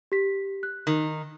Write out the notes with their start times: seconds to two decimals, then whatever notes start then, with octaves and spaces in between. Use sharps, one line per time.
0.12 G4 B6
0.63 F#6
0.87 D#3